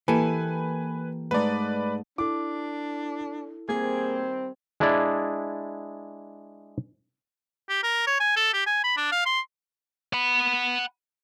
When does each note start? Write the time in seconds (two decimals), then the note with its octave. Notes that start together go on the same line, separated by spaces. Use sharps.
0.08 E3 A#3 G4 A4 B4 G#5
1.31 G#2 A3 D#4 B4 D5
2.18 D4 E4 A4 D6
3.69 D#3 G3 A#3 C4 G#4 A#4 G#6
4.80 G#3 D4 E4 G#4 D5
7.69 G4
7.83 A#4
8.07 C#5
8.20 G#5
8.37 A4
8.54 G4
8.66 G#5
8.84 B5
8.97 D4
9.12 F5
9.26 C6
10.13 F#5 B5